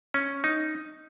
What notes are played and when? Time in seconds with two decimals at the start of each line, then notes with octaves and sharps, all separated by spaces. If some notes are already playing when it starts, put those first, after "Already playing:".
0.14 C#4
0.44 D#4